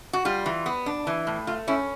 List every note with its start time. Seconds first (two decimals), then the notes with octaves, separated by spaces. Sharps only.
0.13 F#4
0.25 G3 F4
0.46 E3
0.66 B3
0.86 D4
1.07 E3
1.27 A2
1.47 A3 F4
1.67 C#4 E4